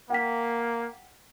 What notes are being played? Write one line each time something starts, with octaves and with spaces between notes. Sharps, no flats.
A#3 F#5 G5 B6